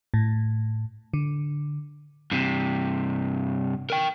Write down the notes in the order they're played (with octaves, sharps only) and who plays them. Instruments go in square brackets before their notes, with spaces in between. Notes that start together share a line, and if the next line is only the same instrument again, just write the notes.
[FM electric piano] A2
D3
[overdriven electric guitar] G2 C3
A#4 G5